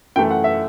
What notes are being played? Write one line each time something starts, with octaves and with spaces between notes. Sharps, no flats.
F#2 E3 A3 G5
F#5
E5